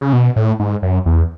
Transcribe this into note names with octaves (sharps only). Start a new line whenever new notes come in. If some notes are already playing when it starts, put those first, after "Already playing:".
C#3
B2
A2
G#2
F#2
E2